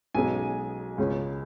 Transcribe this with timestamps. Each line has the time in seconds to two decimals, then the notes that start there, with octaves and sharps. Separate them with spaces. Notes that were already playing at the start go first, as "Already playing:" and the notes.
0.15 B1 B2 G#3 C#4 G#5
0.98 C#2 C#3 G#3 C#4